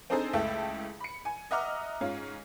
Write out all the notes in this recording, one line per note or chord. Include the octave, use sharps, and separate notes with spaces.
C4 D4 D#4 G#4 A4 C5
C#2 A3 E4 E5 G5 A5
B5 C#7
G#5
D#5 E5 F#5 A#5 D6 F6
G#2 C#4 F4